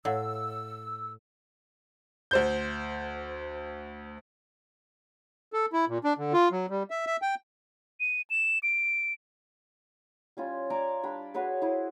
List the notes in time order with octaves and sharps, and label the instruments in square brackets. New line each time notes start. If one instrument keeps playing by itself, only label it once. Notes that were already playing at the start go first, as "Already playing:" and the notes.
[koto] A2 [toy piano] C#5 F5 F#5 [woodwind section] E6
[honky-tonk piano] D2 C5 G6
[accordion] A4
E4
A#2
D4
D3
F4
F#3
G3
E5
E5
G5
[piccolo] D#7
E7
D7
[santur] G3 C#4 F4
D5 G#5 A#5 D6
G3 D4 B5
F#4 G#4 B4 C#5
E4 C5 D#6